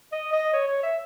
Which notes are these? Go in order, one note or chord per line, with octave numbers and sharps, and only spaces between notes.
D#5
D#5
C#5
C#5
E5